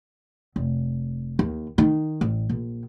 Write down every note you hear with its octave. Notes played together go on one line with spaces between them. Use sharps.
F1
D#2
D#3
A1
A#1